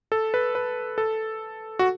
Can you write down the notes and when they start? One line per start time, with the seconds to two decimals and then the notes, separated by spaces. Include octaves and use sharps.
0.12 A4
0.34 B4
0.55 B4
0.98 A4
1.79 F#4